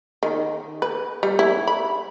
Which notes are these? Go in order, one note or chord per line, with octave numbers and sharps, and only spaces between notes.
D#3
B4
G3
E4
B5